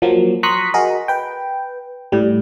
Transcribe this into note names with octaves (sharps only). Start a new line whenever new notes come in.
F3 F#3 A#3
A#5 C6 C#6 D#6 F#6 B6
F#4 G#4 A#4 D#5
B4 G5
A2 G3